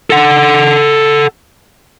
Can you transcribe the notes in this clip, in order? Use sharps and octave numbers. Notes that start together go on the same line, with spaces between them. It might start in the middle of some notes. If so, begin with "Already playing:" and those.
A4 F#5